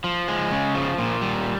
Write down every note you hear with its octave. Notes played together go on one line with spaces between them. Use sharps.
F3
G#3
C#3
F3
A#2
G3